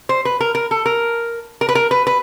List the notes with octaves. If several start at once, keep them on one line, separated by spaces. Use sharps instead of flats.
C5
B4
A#4
A#4
A4
A#4
A#4
B4
A#4
B4
B4